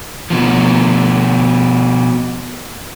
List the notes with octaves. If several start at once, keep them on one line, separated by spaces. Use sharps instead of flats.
B2 F3